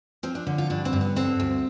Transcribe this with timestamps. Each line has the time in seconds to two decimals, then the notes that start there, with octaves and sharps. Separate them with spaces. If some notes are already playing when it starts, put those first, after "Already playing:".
0.23 F3 C4
0.35 D4
0.47 D3
0.58 F4
0.70 G2 D4
0.85 C4
0.93 G2
1.01 B3
1.16 D3 C4
1.40 D2